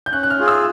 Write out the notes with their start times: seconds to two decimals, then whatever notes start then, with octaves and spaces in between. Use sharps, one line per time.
0.06 G6
0.13 C#4 F#6
0.23 F#6
0.30 F6
0.39 F4 G#4
0.48 E6